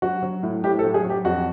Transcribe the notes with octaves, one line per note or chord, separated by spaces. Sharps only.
F#3 F#4
F#3
A2
A2 G4
A4
F#3
G#4
F#3
G4
F2 F#4